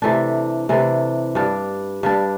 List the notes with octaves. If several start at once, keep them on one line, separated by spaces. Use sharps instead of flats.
C3 E3 A3 D4
C3 E3 A3 D4
G2 G3 D4
G2 G3 D4